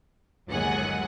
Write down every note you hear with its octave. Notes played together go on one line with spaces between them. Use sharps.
G1 D#2 F#3 G#3 F#5 G#5